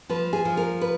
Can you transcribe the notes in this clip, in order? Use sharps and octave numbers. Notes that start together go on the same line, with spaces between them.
F3 B4
G#4
F3
A#4
B4